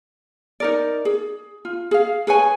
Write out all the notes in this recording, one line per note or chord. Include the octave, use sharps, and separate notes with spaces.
D#4 A#4 D5
G#4
F4
G#4 F5
G#4 B4 C#5 G#5